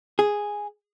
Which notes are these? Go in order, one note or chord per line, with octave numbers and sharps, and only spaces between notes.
G#4